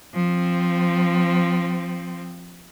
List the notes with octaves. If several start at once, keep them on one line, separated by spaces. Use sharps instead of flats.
F3 C4